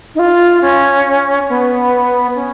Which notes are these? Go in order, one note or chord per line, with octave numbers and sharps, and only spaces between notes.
D#4
F4
C#4
B3
C#4